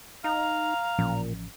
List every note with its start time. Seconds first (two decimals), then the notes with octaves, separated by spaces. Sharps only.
0.24 D#4 F5 A#5
0.99 A1 A#2 F3 C#4